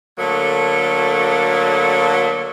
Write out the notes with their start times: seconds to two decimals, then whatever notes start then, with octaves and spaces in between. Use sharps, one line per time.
0.18 D3 F#3 A3 A#3